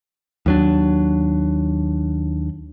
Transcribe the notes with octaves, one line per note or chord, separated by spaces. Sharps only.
D#2 F#3 D4